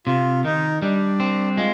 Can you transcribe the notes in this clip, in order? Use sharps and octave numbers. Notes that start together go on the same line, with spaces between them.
C3 F4
D#3 D#4
G3 D4
C4
G#3 F4